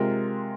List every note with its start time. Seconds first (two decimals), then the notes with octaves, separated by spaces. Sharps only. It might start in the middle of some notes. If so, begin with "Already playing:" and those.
Already playing: C3 G#3 F4 A#4